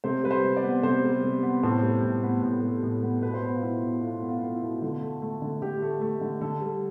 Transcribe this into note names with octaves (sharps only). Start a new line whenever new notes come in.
C3 C5
G3 B4
C5
C3
D5
B3
C3 C5
G3
C3
B3
A2 C5
G3
A2
B3
A2
G3
A2
B3
B2 B4
C5
B3 B4
F4
B3 E4
B2
B2 F4
B3
F4
B3
E4
B2
D3 F4
A3
A3
D3
D3 G4
A3
A3
D3
D3 A4
G3